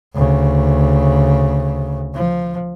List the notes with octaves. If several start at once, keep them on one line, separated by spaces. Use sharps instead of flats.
D2 C#3
F3